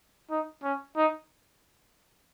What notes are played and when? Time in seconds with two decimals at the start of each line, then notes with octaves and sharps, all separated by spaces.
0.30 D#4
0.63 C#4
0.96 D#4